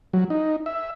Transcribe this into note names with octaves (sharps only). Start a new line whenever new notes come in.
F#3
D#4
E5